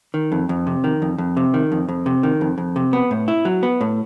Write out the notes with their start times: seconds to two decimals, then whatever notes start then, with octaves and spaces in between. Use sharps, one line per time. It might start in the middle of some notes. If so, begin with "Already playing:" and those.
0.14 D#3
0.32 F2
0.49 F2
0.67 C3
0.84 D#3
1.02 F2
1.18 F2
1.37 C3
1.54 D#3
1.72 F2
1.89 F2
2.06 C3
2.23 D#3
2.41 F2
2.58 F2
2.76 C3
2.93 B3
3.11 A2
3.28 E4
3.45 F#3
3.63 B3
3.81 A2